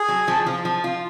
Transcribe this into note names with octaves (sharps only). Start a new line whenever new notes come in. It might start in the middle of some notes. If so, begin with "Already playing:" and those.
Already playing: G#4
F#3
F3
F3
F3
F4